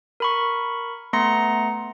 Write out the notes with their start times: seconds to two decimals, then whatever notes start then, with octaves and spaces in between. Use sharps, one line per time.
0.20 A#4 B5 C#6
1.13 A3 B3 A#5 C6 A#6 C#7